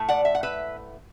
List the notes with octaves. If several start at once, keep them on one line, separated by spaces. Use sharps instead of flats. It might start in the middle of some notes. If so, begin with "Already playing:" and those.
Already playing: A2 A3
D5 F#5
E5
F#5
B4 E5